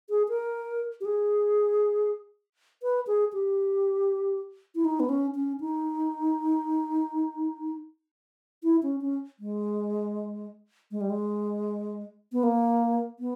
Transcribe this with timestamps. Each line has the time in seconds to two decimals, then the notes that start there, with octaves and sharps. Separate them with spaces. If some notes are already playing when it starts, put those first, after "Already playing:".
0.10 G#4
0.29 A#4
1.01 G4
1.05 G#4
2.83 B4
3.07 G#4
3.33 G4
4.75 E4
4.85 D#4
5.00 B3
5.09 C#4
5.35 C#4
5.61 D#4
8.63 E4
8.83 C#4
9.01 C#4
9.40 G#3
10.91 G#3
11.01 G3
11.10 G#3
12.32 B3
12.43 A#3
13.19 B3